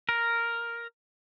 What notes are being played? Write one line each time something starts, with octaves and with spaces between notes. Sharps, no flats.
A#4